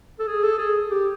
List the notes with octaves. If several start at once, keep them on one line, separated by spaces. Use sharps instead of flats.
A4
G#4
A4
G#4
G4